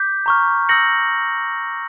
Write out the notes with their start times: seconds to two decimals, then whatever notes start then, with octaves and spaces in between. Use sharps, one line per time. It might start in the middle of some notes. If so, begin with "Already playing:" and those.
Already playing: D6 G6 B6
0.26 A#5 C#6 F6
0.69 E6 G6 A#6 C#7 F#7